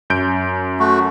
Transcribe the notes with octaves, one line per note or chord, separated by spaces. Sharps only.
F#2 G6 D7
A3 F#4